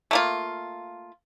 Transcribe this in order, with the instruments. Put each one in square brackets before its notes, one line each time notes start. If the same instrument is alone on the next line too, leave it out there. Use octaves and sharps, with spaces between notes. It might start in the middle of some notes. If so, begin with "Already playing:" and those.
[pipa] A3 A#3 F4